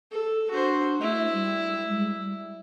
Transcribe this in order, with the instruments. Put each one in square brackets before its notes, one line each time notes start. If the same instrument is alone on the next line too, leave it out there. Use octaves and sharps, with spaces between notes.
[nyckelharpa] A4
[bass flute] D4 [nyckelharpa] F#4 C5
[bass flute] A3 [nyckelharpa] E4
[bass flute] G3
G#3
G3